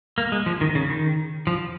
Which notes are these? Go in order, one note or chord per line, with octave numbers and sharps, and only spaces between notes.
A#3
G#3
F3
D#3
C#3
D#3
F3